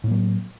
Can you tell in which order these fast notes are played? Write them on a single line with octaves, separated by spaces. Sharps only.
A2 A#3 F#3